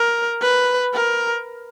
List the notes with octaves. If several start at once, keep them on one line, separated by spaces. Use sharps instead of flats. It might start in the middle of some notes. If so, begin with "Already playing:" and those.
Already playing: A#4
B4
A#4